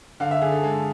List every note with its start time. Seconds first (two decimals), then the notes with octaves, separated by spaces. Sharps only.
0.20 D3 F5
0.31 E5
0.41 D3 G#4
0.52 A4
0.63 G#3 A4